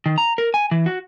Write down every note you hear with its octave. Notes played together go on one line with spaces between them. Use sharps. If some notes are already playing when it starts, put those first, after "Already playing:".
D#3
A#5
A#4
G#5
E3
F#4